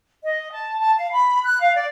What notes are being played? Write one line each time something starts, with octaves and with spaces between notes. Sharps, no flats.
D#5
A5
A5
F5
B5
F#6
F5
D5